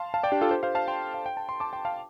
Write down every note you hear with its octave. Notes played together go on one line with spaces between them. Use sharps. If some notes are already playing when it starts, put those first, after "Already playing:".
Already playing: F5 A5 C6
F5 A5
D5 G5
D4 G4
F4 A4
G4 C5
C5 F5
F5 A5
G5 C6
F5
G5
A5
C6
A5 D6
G5 C6
F5 A5